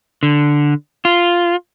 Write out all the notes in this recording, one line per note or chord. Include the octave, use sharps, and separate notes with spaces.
D3
F4